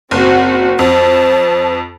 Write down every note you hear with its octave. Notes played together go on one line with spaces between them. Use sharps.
F#1 C4 F#4
F2 C5 A5